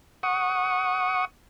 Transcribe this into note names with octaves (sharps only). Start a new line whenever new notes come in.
F#5 C#6 D#6